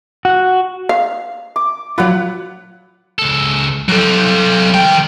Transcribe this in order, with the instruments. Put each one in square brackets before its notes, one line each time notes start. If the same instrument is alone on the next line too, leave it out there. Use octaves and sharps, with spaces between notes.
[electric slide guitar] F#4
[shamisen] F5
[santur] D6
[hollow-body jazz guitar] F#3 F4 [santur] B4 F#5
[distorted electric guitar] C#2 A4
[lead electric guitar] F#3 A4 [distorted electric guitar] G3 C4
[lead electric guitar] D#3 G5